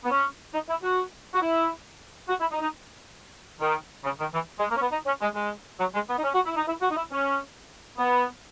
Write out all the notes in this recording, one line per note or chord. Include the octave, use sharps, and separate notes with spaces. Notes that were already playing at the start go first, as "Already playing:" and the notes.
B3
C#4
D#4
E4
F#4
F#4
E4
F#4
E4
D#4
D#4
D#3
C#3
D#3
E3
G#3
A#3
C#4
B3
D#4
C#4
G#3
G#3
F#3
G#3
B3
D#4
C#4
F#4
E4
D#4
E4
F#4
D#4
E4
C#4
B3